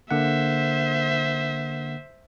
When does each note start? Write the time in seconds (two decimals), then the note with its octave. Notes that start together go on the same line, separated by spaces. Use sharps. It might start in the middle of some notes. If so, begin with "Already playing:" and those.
0.11 D3 A#3 C5 E5 F#5